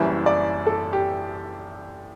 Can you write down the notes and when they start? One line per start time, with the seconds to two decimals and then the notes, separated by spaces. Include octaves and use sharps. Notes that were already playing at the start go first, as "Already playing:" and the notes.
Already playing: F#1 F#2 E3 G3 E5
0.26 D5
0.66 A4
0.93 G4